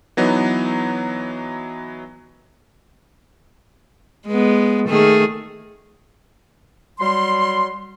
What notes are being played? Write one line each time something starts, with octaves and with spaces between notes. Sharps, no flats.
E3 F#3 B3 D#4
G#3 B3
D#3 A3 G#4
F#3 G3 C6